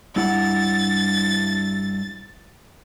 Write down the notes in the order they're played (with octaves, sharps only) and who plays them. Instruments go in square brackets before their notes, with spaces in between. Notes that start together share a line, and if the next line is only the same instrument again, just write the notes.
[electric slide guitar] G2 E4 F#5 [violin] A6